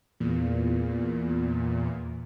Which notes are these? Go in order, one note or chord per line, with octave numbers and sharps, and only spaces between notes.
E2 A#2